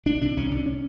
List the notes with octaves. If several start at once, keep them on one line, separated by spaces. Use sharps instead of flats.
C2 D4
C3 D4
C2 C#4
C3 D4
C#4